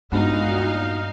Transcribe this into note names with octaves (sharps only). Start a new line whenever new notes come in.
G2 A#2 G#3 B3 D4 D#4 F#4 F5